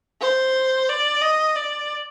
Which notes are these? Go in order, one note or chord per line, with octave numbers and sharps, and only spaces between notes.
C5
D5
D#5
D5